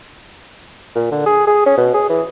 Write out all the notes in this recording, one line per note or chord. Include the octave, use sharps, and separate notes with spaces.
A#2
D3
G#4
G#4
C#4
B2
G#4
E3